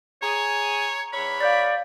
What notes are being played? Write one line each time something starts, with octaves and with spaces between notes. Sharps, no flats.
G#4 C#5 A#5
E2 C#5 B5
D5 F5 G6 A6